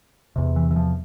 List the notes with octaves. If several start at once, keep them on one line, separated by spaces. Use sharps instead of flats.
E2 C3
E3
E3
F3